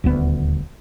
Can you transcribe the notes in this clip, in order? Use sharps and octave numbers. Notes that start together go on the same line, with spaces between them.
D#1 D2 B3